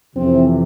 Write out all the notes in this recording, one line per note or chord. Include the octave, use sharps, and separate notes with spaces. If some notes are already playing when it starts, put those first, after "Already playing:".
F2 C3 E3 C4